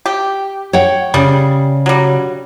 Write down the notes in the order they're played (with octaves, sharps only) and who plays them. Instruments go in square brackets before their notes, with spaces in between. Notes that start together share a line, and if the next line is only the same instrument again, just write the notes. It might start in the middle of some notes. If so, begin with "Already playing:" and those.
[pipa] G4
[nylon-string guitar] C#5 F#5 G5
[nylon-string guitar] C#3 [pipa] G3
[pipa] F#3 G3